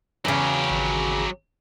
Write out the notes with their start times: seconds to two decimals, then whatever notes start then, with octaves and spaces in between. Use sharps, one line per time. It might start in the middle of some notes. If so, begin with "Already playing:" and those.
0.25 E2 C#3 F#3 G4
0.70 G#1